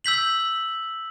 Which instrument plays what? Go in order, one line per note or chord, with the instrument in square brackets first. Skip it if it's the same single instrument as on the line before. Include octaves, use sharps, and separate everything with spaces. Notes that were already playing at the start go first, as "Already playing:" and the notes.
[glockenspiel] E6 G6 B6 F#7